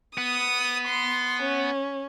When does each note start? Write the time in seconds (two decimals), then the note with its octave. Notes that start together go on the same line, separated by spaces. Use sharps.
0.18 B3 D#6
0.87 C6
1.43 C#4